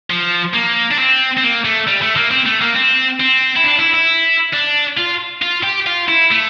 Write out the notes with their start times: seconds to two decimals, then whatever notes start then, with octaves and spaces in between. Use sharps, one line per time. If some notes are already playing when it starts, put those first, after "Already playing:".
0.10 F3
0.54 A#3
0.91 D4
0.99 C4
1.38 C4
1.43 A#3
1.65 A3
1.87 G3
2.02 A3
2.16 A#3
2.31 C4
2.46 A3
2.61 A#3
2.75 C4
3.20 C4
3.56 E4
3.64 D4
3.79 E4
3.94 E4
4.53 D4
4.97 F4
5.42 F4
5.63 G4
5.87 F4
6.09 E4
6.31 A3